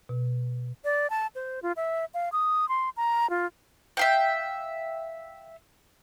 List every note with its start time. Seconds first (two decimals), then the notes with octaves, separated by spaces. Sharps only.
0.09 B2
0.84 D5
1.10 A5
1.35 C5
1.63 F4
1.76 E5
2.14 F5
2.32 D#6
2.69 C6
2.97 A#5
3.30 F4
3.97 E5 F5 G5